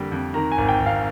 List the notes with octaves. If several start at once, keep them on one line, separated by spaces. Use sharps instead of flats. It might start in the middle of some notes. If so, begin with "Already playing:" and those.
Already playing: F2 D3 G3 A#3
F2
D#3 A#5
G#5
G#1
G5
G#1
F5